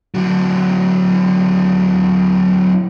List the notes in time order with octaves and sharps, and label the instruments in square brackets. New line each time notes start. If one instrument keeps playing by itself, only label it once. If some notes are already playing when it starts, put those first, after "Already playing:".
[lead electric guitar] D3 F#3